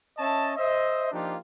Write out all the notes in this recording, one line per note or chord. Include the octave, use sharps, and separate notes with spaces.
C#4 C#5 D#5 E5 A5
C5 D#5 E5
F3 A#3 D4 D#4 F4 G4